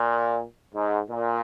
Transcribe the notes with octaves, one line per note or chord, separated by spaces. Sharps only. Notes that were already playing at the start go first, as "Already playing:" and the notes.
Already playing: A#2
G#2
A#2